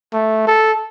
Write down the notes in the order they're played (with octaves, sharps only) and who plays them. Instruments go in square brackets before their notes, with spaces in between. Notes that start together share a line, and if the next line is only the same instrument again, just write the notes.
[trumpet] A3
A4